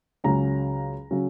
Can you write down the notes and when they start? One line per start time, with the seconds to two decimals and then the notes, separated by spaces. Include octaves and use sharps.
0.24 C#2 C#3 F#3 C#4 A#5
1.11 C#3 F#3 C#4